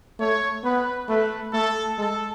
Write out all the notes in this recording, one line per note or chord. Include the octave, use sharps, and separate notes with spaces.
A3 C#5
B3 B4
A3 B4
A3 A4
G#3 A4